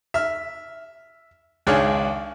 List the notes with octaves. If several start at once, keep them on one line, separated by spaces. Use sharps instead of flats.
E5 F6
G#1 C#2 D4 G#4 C#5 F6